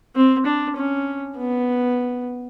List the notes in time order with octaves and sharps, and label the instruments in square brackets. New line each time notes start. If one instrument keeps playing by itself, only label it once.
[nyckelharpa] C4
D4
C#4
B3